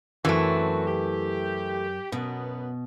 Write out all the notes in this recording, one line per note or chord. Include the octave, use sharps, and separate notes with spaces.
F#2 E3 A3 C4 C#4 F#4
G4
F#2 B2 B3